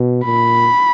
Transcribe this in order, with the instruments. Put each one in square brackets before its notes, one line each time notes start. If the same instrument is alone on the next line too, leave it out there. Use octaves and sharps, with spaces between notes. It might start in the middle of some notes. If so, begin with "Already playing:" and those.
Already playing: [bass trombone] B2
[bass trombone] A#2 [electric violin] B5